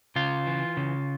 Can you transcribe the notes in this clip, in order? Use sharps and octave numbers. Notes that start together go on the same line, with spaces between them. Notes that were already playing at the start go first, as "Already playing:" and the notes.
C#3 F4
E3
C#3